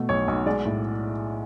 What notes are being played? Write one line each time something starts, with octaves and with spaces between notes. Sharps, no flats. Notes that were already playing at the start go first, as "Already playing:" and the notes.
Already playing: B2 A3
B1 C#5
B1
G#3 D5
A2